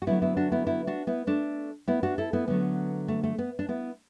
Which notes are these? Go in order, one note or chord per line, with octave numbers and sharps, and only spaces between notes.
F#4
D3 F#3 A3 B3 E4
B3 E4
D4 F#4
B3 E4
B3 E4
D4 F#4
B3 E4
A3 D4
B3 E4
D4 F#4
E4 A4
B3 E4
D3 F#3 A3 B3
A3
A3
B3
D4
B3 E4